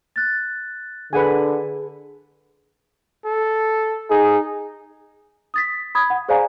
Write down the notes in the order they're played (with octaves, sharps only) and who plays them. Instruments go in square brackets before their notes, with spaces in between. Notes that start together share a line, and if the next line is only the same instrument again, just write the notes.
[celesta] F#6 A6
[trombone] D3 [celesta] G#4 [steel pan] B4 F#5 G#5
[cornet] A4
[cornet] D#4 [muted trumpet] G#4
[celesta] D#6 A6 B6
B5 D#6 G#6
F#5
G#4 C5 D5 F5 G#5 A#5